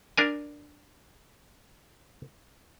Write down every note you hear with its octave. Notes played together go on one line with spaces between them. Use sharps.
D4 A#4 G#5